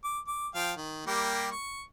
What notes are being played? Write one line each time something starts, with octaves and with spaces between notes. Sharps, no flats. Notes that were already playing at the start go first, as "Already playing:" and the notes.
D6
D6
F3 F5 G5
D#3
G3 A#3 G4
C#6